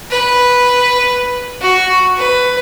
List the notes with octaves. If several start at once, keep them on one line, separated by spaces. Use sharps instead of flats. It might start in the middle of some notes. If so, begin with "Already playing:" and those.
B4
F#4
B4